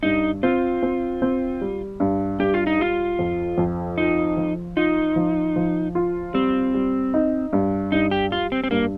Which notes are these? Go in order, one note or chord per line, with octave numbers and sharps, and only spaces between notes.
G2 D#4
C4 F4
C4
C4
G3
G2
G2 G4
F4
D#4
G3 F4
F2
F2
D#4 F4
F3
D#4 F4
F3
F3
F4
G3 C4
G3
D#4
G2
G2 D#4
G4
G3 F4
C4
C4
G2 A#3